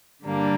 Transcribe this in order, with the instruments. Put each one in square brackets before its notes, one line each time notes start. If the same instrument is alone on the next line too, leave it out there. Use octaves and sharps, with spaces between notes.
[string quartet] G2 D3 G3 A#3 D4